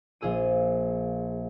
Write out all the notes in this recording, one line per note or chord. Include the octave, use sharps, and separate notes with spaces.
A#1 F4 G#4 E6 D#7